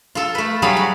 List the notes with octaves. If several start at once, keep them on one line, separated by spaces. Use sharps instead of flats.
F4 A4
A3 B4
F#3 G3 G#4 F5 B5
F#4